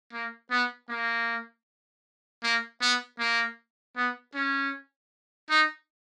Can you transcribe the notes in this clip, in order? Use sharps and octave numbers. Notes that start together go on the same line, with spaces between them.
A#3
B3
A#3
A#3
B3
A#3
B3
C#4
D#4